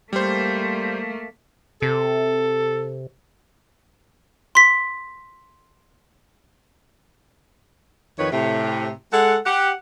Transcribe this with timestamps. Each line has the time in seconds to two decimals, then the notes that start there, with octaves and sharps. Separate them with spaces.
0.13 G3 A3 A#3 C5
1.82 C3 A4
4.55 C6 B6
8.19 F2 D#3 B4 C#5
8.32 A2 C3
9.13 G#3 A4 F#5
9.46 G4 F#5